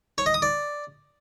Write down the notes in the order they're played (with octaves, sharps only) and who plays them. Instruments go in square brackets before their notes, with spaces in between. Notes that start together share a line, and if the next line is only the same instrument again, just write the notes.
[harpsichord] C#5
D#5
D#6
D5